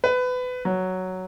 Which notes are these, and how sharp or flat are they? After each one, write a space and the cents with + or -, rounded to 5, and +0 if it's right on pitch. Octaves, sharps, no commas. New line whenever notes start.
B4 +25
F#3 +5